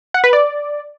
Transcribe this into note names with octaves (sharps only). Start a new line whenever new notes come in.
F#5
B4
D5